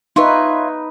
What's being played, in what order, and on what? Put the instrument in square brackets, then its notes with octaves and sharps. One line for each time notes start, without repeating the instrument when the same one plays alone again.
[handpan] D#4 B4 [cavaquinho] F4 C#5 E5